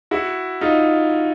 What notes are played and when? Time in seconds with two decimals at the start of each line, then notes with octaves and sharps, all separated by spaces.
0.11 E4 F#4
0.61 D#4 F4